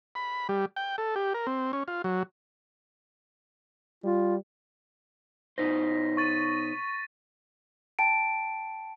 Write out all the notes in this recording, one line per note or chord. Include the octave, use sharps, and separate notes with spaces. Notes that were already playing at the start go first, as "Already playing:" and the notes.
B5
G3
G5
A4
G4
A#4
C4
C#4
F4
F#3
G3 F4
B2 D#4 C5 A#6 B6
C#6 A6 D#7
G5 A5 D7